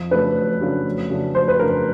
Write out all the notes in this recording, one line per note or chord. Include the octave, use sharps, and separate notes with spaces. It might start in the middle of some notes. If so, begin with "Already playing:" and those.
Already playing: F2
C#3 F#3 A3 D4 B4
F2
C#3 F#3 A3 D4
F2
C#3 F#3 A3 D4
F2 C5
B4
C#3 F#3 A3 D4 A#4